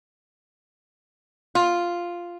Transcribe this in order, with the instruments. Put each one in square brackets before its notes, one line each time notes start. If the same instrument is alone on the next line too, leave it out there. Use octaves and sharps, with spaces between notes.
[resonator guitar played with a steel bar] F4